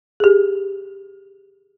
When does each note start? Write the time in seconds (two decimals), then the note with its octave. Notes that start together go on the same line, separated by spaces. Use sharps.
0.20 G4 G#4